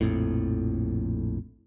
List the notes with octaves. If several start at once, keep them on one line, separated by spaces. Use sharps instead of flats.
A#1 F2 A2